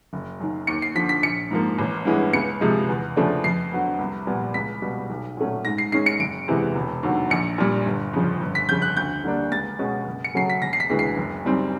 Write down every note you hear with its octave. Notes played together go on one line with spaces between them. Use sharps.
F#1
F#2 D#3
D#2 C#7
C7
D3 F3 B6
B6
A#1 C#7
G#2 F3 A#3
A1
G2 E3 G#3 B3
C#2 C#7
C3 F3 G#3
E2
C#3 F3 A3 D4
F2 C7
D3 F#3 B3
C2
A#2 G3 B3
C#2 B6
B2 G3 B3
B1
A#2 F#3 A3 C#4
G#2 A#6
C7
D#3 G#3 C#4 C7
C#7
F#1 D7
E2 C3 E3 G#3
E1
D#2 D3 F#3
A#1 C#7
A#2 G3
G1
F2 C#3 F3
G1
B6
F2 C#3 G6
F#6
D2 G6
D3 G3 A#3 D4
C#2 A6
B2 G#3 C#4
F#1
C#7
F#2 C#3 F#3 A3 C7
B6
E1 A#6
C7
B6
D2 C#3 E3 G#3
C7
F#1
F#2 D#3 G3 C4